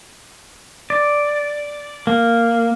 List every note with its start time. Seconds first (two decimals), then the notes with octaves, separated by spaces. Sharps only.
0.90 D5
2.07 A#3